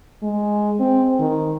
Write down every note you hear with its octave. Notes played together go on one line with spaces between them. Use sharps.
G#3
C4
D#3